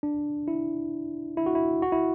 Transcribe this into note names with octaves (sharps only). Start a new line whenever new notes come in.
D4
E4
E4
F#4
E4
F#4
E4